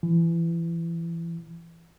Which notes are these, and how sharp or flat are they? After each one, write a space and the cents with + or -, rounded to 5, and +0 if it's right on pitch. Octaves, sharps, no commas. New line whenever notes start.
E3 +25